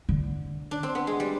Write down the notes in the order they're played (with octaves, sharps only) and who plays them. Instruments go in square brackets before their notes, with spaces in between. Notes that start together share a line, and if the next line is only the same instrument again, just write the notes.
[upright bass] D3
[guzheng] D4
C4
B3
G#3
G3